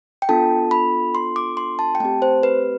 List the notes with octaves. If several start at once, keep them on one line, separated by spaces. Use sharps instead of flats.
G5
B3 D4 F4 A4 A5
B5
C6
D6
C6
A5
G5
A3 C4 G4 A5
C5
B4